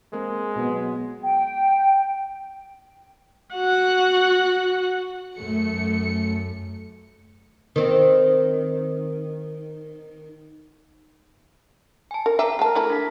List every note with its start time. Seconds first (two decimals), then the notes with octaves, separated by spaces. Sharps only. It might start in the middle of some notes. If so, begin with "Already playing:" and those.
0.13 G#3 A#3 C4
0.55 B2 F#3 B3
1.23 G5
3.55 F#4 F#5
5.37 F#2 A3 C#7
7.76 D#3 C4
12.11 G#5 A5
12.26 A#4
12.39 E5 G5 A#5 D6
12.59 G#3 A#4 A5
12.75 A3 E4
12.90 D4 B6